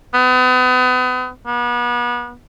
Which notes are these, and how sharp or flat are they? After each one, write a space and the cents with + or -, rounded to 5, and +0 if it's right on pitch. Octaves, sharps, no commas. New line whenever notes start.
B3 +35
B3 -35